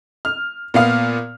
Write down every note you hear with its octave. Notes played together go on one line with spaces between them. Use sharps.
F6
A#2 B3 F5 F6